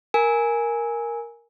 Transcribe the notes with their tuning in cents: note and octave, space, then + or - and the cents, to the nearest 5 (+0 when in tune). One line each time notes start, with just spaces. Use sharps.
A#4 +0 G#5 +0